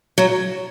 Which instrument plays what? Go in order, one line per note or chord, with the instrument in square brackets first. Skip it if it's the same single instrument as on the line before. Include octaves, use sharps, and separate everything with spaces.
[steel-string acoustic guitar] F#3